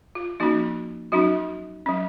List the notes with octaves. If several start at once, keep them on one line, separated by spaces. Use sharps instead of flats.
F4
F3 A#3 C#4 D#4 F#4
F#3 C#4 D#4 F#4
F#3 C#4